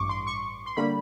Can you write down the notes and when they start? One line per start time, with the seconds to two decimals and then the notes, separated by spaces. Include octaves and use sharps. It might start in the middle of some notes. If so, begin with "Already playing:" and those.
Already playing: A1 G2 C#6 D6
0.09 C6
0.27 C#6
0.66 C6
0.77 D3 G3 A#3 B5